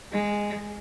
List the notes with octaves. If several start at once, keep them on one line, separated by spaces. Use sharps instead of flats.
G#3